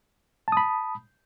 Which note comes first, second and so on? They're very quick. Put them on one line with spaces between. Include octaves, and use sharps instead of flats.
A5 D#6 B5